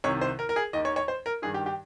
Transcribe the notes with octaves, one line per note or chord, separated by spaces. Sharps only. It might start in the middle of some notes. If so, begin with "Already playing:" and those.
C2 C3 D#3 C#5
C5
A#4
A#4
G#4
D#2 D#3 D#5
C#5
C#5
C5
A#4
G2 D#3 G#4
G4
G4